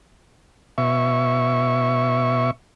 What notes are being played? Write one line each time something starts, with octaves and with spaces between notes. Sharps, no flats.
B2 E5 C#6